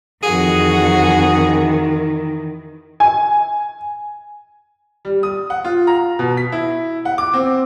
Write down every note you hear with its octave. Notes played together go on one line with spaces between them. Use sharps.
F2 D#3 E3 F#4 G#4
G#5
G3
D#6
F#5
F4
A#5
B2
B6
E4
F#5
D6
C4